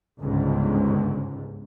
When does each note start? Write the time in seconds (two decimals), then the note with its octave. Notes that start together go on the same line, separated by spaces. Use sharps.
0.20 G1 C#2 G#2